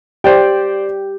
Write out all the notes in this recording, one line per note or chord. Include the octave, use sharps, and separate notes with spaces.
G4 C5 D5 G5